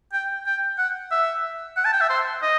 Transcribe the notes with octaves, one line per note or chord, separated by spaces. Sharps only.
G5
G5
F#5
E5
F#5
A5
G5
E5
C5
D#5